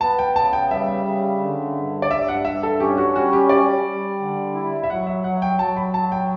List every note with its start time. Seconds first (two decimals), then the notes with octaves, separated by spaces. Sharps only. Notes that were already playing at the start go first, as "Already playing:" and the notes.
0.01 B3 A5
0.19 G5
0.35 C#3 A5
0.53 G5
0.71 G3 E5
1.06 C#3
1.41 D3
1.75 G2
2.02 D5
2.10 G2 E5
2.28 F#5
2.45 G2 E5
2.63 A4
2.80 C#4 G4
2.97 F#4
3.15 G3 F#4
3.33 G4
3.49 G3 D5
3.85 G3
4.20 D3
4.54 E4
4.83 E5
4.90 F#3 F#5
5.07 E5
5.24 F#3 F#5
5.42 G5
5.59 F#3 A5
5.77 B5
5.94 F#3 A5
6.12 G5